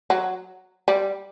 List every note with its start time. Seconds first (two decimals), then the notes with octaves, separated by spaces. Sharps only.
0.10 F#3
0.88 G3